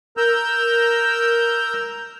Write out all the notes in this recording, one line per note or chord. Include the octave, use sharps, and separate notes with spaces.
A#4 A#5 E6 G6